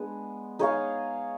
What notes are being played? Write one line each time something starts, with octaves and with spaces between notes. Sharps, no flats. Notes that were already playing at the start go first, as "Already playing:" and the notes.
Already playing: G#3 B3 D4
D#4 G#4 C#5 F5